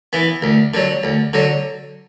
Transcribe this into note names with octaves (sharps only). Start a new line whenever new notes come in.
E3 B3
D2
D3 F#3
D2
D3 F#3